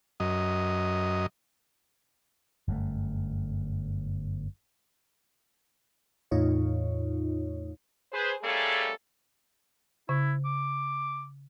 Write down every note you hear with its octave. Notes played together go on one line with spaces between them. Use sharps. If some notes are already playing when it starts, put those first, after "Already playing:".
F#2 D#5
G1 F#2 B2 A3
E2 A2 D#4 F4 C#5
G#4 B4 C5
G3 A3 A#3 C#4 G#4 A4
C#3 E4
D6